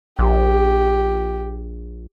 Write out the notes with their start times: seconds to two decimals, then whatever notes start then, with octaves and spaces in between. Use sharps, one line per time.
0.19 A#1 G4